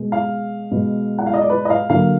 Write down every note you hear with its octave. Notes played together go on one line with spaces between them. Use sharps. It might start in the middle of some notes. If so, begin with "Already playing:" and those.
Already playing: B2 G#3
F5
B2 G#3 B3
F#5
F5
D#5
D5
B4
D#5
F5
D3 F#3 A#3 F5